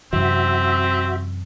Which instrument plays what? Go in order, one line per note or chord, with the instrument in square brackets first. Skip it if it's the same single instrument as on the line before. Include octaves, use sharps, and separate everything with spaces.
[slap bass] F#2 E3 [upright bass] C3 [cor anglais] C4 [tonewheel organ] F#4 E5